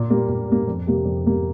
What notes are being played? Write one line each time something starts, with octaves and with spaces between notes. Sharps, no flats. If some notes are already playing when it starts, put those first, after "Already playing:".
Already playing: A#2
G3 A#3
A#2
G3 A#3
F2
C3 G3 A#3
F2
C3 G3 A#3